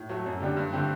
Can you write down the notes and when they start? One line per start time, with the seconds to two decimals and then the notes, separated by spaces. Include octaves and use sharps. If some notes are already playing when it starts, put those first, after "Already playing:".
Already playing: A2
0.09 F#3 A3
0.26 F#2
0.40 D3 G3 D4 G4
0.57 G2
0.72 D3 A3 C4 G4